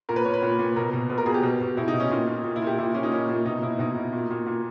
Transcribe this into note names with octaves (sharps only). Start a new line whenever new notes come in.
A#2 A#4
B4
A#2 C#5
B4
A#2
A#2
B2 A#4
B2
B2 B4
A#4
B2 G#4
G4
B2
B2
B2 E4
D#4
B2
C#4
A#2 D#4
A#2
A#2
E4
A#2 G4
A#2 E4
A#2 C#4
D#4
A#2 C#4
A#2
B2 D#4
B2 E4
B2 D#4
B2
A#2
A#2
A#2